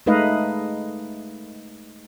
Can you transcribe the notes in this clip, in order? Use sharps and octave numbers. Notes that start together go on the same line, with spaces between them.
G#3 A3 D#4 B4 D#5 F5